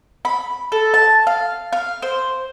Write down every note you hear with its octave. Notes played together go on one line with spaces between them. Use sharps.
B5
A4
A5
F5
F5
C5